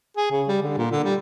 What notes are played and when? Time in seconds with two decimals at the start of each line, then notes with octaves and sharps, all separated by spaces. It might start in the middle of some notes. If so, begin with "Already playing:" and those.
0.17 G#4
0.31 C#3
0.48 G3
0.63 D3
0.78 A#2
0.91 D3
1.04 G3